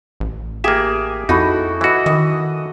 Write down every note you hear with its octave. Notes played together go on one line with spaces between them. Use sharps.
A1
A#3 G4 G#4 E5
F2 D#4 E4 F#4 A4
E3 F#4 D#5 E5
D#3 D#5